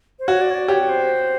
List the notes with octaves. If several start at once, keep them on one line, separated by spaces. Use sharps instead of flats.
C5
F#4 C#5
D5
C#5
D5
G4 C#5
C5